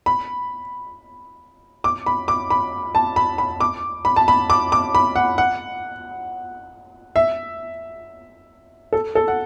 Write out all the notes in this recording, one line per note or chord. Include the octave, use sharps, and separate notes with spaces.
B5
D6
B5
D6
B5
A5
B5
B5
D6
B5
A5
B5
D6
D6
B5
F#5
F#5
E5
A4
A4
F#5